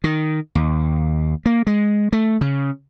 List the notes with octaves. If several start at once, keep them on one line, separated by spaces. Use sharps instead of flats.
D#3
D#2
A#3
G#3
A3
C#3